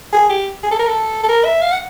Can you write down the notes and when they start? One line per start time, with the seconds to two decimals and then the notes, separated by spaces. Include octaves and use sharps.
0.13 G#4
0.30 G4
0.63 G#4
0.71 A4
0.79 A#4
0.87 A4
1.23 A4
1.29 A#4
1.45 E5
1.62 F5
1.72 F#5